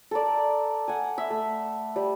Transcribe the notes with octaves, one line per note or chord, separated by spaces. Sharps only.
A4 A#4 D5
F#5 G#5
E5 B5
A3
G3